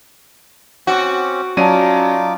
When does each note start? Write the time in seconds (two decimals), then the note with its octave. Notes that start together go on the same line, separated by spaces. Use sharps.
0.87 C4 C#4 F#4 D6
1.57 F#3 C#4 D#4 F4 D5 A5 D6 D#7